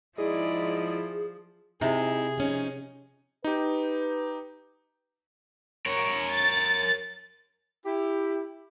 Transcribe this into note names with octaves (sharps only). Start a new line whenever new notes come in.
G#2 F3 E4 G#4 D5 D#5
C3 D#4 E4 G#4
F3 C#4 D#4
D#4 G4 B4
A#4 C#5
A6
E4 G4